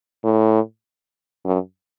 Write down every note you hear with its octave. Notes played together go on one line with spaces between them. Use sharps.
A2
F#2